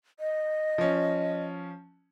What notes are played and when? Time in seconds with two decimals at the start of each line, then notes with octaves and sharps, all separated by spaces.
0.20 D#5
0.78 F3 C#4